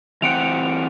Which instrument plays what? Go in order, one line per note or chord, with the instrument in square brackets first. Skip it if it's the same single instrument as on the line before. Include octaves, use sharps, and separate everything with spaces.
[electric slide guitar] E3 C4 F#5 [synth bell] C#7 D7 F7